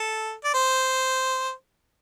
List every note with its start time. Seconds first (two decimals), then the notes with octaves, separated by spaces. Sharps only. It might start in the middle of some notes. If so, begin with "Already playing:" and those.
Already playing: A4
0.44 D5
0.54 C5